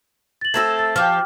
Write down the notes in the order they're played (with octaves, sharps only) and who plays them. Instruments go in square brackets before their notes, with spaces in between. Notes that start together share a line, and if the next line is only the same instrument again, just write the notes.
[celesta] A6 F#7
[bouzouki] A3 C4 A4 [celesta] G#6 A#6
[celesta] A6
[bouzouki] F3 G4 [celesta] G5 D6 F6